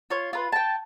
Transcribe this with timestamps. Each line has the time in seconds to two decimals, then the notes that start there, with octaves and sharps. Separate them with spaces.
0.10 F4 C#5
0.33 F4 B4
0.52 G5 A5